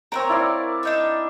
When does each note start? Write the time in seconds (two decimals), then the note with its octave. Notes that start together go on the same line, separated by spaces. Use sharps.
0.12 C4 A#4 B4 C#5 A#5
0.29 E4 D5 F5
0.83 D4 D#4 E5